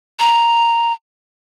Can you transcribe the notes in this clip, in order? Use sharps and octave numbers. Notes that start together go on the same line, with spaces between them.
A#5